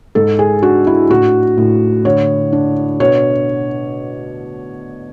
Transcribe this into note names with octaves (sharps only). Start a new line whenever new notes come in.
G#2 A4
G#4
D4 F#4
E4
A2 F#4
A2
D3 C#5
D4
B2 C#5